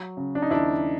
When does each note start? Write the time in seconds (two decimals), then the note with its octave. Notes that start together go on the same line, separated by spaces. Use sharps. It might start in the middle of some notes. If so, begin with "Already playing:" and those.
Already playing: F#3
0.17 C#3
0.35 D4
0.42 D#4
0.50 D#2 D4 E4